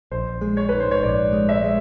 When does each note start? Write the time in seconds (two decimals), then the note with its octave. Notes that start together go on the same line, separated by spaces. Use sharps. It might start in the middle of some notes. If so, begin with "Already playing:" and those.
0.11 A#1 C5
0.41 G#3
0.57 C#5
0.69 G#2 B4
0.80 C5
0.91 C#5
1.02 A#1 D5
1.33 G#3
1.49 E5
1.64 G#3